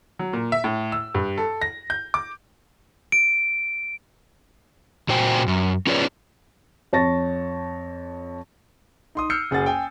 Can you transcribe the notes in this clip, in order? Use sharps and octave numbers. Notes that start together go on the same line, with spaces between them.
F#3
A#2
E5
A2
E6
G2
A4
A#6
G6
D6
D7
A#2 F#4 C5 G5 G#5
F#2
C#4 F4 G#4 B4 C#5 D5
F2 C#5 A5 C#6 A6 A#6
D#4 C6 D#6
E6 F6 G6 C7 C#7
F#1 G#4 F#5 A6
G5 G#5